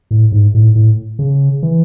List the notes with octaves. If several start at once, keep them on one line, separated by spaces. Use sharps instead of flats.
A2
G#2
A2
A2
C#3
E3